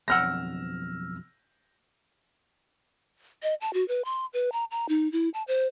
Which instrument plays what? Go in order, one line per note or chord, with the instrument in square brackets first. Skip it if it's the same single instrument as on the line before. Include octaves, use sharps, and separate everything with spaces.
[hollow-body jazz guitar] B1 F2 F#5 [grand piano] E6 F6 A#6
[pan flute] D#5
A5
F#4
B4
C6
B4
A#5
A#5
D#4
E4
A5
C5